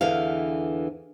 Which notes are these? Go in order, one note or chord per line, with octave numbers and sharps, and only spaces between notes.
E2 D3 E3 F5